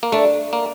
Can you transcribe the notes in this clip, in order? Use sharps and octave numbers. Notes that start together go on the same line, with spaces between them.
A#3
A3 D4
A#3